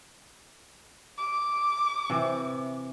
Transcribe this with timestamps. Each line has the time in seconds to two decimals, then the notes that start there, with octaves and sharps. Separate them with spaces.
1.18 D6
2.10 C3 E3